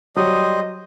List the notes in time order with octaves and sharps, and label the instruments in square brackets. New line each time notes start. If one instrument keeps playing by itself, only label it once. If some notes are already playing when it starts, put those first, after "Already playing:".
[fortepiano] F#3 [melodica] G3 C5 D#6 [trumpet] D#5